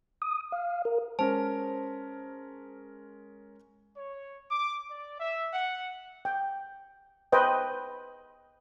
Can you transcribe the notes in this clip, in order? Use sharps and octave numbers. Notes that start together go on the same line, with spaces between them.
D#6
F5
A#4
G#3 C#4 A#4 C5 A5
C#5
D6
D5
E5
F#5
G5
B4 C5 D#5 G5